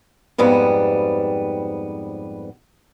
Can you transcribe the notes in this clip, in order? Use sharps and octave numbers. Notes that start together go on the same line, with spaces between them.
F2 G#2 G3 B3